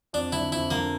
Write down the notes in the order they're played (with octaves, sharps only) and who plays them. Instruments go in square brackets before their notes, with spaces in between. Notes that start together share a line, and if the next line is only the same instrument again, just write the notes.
[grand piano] F2 [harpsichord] D4
[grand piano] D3 [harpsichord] E4
[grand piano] F2 [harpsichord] E4
[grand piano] D3 [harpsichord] A#3